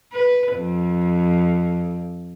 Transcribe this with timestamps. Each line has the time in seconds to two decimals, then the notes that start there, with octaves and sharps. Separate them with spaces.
0.13 B4
0.55 F2